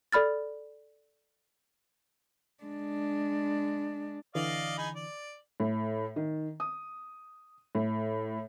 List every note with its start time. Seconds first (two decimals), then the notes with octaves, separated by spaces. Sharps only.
0.12 A4 D5 B5 F6 A6
2.64 G#3 D4
4.35 D3 E3 D5 D#5 F5
4.78 D#4 G#4 B5
4.95 D5
5.60 A2
6.16 D#3
6.60 D#6
7.75 A2